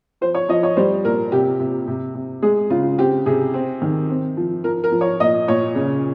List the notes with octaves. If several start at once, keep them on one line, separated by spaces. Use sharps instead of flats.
F3 C5
C#5
F3 D#5
C#5
G3 C5
A#2 A#4
C3 G4
C3
C3
C3
G#3 G#4
C#3 F4
C4 G4
C3 G#4
C4
D#3
C4
F3
F3 A#4
A#4
F3
C#5
A#2 D#5
A#2 C#5
C#3